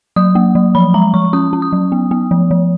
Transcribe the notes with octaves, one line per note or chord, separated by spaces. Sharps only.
F#3 D#6
A#3
F#3
F3 B5
G#3 A#5
F3 C#6
C#4 D#6
C#4
D#6
F#3
B3
B3
F3
F3